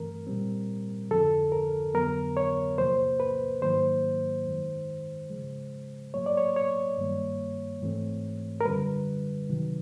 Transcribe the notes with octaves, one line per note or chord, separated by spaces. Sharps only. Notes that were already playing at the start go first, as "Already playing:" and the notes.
Already playing: G2 E3 A3 C4 A#4
A#2 G3 C4
F2 D3 F3 A4
A#4
F2 D3 F#3 B3 A#4
C#5
E2 C3 F3 A#3 C5
B4
G#2 D#3 F#3 A#3 C5
F#2 D#3 G#3
C#3 F3 G#3
A2 F#3 A#3 C#5
D5
C#5
C#5
G2 D#3 G3 A#3
G#2 E3 A3 C4
A#4
F#2 D3 G3 B4
C3 D#3 F#3